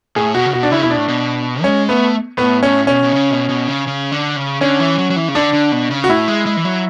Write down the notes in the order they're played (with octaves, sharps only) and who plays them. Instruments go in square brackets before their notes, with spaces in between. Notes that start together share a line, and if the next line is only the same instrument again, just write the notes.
[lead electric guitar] A2 [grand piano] G#4
[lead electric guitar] B2 [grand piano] F#4
[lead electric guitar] C#3
[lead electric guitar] B2 [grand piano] F#4
[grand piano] D4
[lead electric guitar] C#3 [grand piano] E4
[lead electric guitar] B2 [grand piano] E4
[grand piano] D4
[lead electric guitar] A2
B2
[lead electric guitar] G#3 [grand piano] C#4
[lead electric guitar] A3 [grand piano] B3
[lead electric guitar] A2 [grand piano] B3
[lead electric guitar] A2 [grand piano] C#4
[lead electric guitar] B2 [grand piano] C#4
[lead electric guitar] B2
C#3
B2
B2
C#3
C#3
D3
C#3
[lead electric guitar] D3 [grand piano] C#4
[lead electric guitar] E3
F#3
F#3
E3
C#3
[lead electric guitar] D3 [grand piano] D4
[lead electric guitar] D3
B2
C#3
[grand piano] F#4
[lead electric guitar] A2 [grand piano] E4
[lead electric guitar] G#3
G#3
E3
F#3